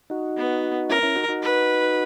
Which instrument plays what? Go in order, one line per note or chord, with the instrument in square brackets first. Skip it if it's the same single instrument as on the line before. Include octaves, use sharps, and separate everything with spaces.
[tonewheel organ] D#4 F#4
[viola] B3
[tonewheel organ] C#4 E4 [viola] A#4
[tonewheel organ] C#4 E4
D#4 F#4
D#4 F#4
[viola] B4